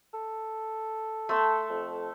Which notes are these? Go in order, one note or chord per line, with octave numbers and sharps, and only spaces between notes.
A4
A3 C6 E6
F2